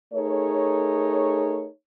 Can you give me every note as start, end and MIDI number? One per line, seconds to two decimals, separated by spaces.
0.14 1.67 57
0.14 1.67 63
0.14 1.67 68
0.14 1.67 70
0.14 1.67 73